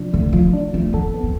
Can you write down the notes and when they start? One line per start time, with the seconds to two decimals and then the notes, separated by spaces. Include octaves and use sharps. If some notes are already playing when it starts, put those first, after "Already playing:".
Already playing: C3 F3 D4
0.13 D3 A3
0.33 F3 F4
0.53 D4
0.73 F3 A3
0.93 B3 A4
1.14 B3
1.23 C4